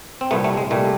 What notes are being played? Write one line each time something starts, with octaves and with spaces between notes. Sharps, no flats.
C4
C2 A#2 G3 A3 B3
A3
G#3
C2 A#2 G3 A3